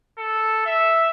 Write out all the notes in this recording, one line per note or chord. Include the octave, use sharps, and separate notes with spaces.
A4
E5